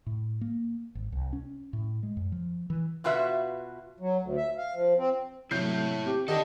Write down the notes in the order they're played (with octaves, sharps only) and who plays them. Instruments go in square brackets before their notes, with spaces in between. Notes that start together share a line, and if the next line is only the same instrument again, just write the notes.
[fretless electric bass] A2
A#3
G#1
C2
C#4
A2
G#3
F#2
F3
E3
[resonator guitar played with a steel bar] B2 F4 F#4 B4 E5
[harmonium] F#3
D2
E5
F5
F3
C4
[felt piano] C3 F#3 [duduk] A3 [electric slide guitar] E4 C#5 E5 [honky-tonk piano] G6 C7
[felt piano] C4 [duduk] G4
[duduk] D#3 [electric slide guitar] D4 A4 [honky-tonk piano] G4 D#5 [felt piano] D5 A5 A#6